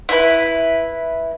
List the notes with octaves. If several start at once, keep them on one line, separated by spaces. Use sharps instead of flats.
E4 B4